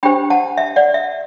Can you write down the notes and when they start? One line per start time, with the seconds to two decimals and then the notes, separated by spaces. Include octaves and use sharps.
0.03 D4 G4 C5 G5 B5
0.30 F#5 A5
0.57 E5
0.76 D5 F#5
0.94 E5